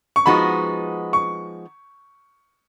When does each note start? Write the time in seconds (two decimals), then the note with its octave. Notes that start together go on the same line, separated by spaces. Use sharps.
0.16 C#6
0.26 F3 G#3 B3 D#4 F#4 B5
1.13 C#6